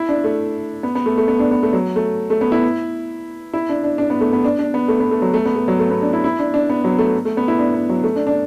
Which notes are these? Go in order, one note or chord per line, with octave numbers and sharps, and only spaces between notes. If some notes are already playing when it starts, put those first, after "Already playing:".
Already playing: E4
D4
A3
B3
B3
A3
A3
B3
D4
B3
A3
F#3
A3
A3
B3
E4
E4
D4
D4
D4
B3
A3
B3
D4
D4
B3
A3
B3
A3
F#3
A3
B3
A3
F#3
A3
B3
D4
E4
E4
D4
D4
B3
F#3
A3
A3
B3
E4
D4
B3
F#3
A3
D4
D4